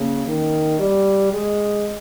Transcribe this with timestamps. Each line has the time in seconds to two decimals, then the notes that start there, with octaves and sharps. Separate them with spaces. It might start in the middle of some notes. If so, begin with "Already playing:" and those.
Already playing: C#3 A#3 C#4
0.27 D#3
0.79 G3
1.33 G#3